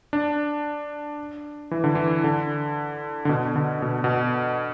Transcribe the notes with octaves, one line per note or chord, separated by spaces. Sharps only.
D4
E3
D3
E3
D3
D3
B2
D3
B2
B2